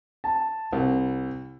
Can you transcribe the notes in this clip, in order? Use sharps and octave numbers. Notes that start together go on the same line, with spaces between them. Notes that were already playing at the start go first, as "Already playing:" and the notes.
A5
C2